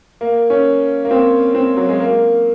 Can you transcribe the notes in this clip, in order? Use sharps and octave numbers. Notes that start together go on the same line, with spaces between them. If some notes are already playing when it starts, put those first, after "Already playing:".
A#3
C#4
A#3
C4
C4
F#3
G#3
A#3